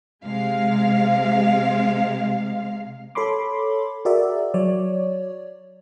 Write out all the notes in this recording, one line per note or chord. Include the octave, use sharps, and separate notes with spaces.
C3 G#3 F5
A4 C#5 B5 C6 D6
F#4 G#4 A#4 D5 E5
F#3 C#5 D5